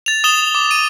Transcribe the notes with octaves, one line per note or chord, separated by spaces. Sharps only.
A6 F7
D#6 E7 G7
D6
D#7